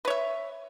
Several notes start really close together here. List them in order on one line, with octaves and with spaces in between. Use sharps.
B4 C#5 E5